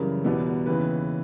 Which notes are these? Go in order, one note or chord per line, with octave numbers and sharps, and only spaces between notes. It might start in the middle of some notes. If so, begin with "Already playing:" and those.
Already playing: F#2 C#3 E3 G3 A#4
E2 B2 G3 B3
D#2 C#3 E3 B4